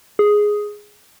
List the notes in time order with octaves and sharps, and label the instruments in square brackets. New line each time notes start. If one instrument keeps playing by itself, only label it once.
[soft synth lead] G#4